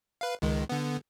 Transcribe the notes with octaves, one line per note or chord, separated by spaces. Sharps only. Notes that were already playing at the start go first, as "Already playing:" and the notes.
B4 F5
C#2 D#3 G#3
D3 B3